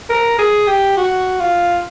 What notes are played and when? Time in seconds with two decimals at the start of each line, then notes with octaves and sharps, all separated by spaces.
0.09 A#4
0.39 G#4
0.67 G4
0.97 F#4
1.40 F4